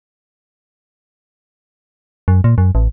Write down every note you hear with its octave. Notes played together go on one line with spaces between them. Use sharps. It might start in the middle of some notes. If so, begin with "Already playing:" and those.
F#2
A#2
F#2
A1